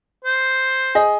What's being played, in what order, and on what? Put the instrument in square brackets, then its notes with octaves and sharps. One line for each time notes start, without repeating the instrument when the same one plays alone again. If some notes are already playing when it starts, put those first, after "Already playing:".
[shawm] C5
[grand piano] G#4 D#5